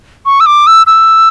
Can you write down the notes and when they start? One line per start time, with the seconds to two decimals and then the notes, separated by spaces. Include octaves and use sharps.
0.26 C#6
0.40 E6
0.46 D6
0.67 E6
0.87 E6